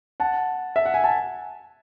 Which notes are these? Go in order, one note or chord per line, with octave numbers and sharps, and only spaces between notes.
F#5 A5
E5
F#5
G#5
A5